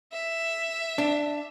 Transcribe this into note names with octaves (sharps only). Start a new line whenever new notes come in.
E5
D4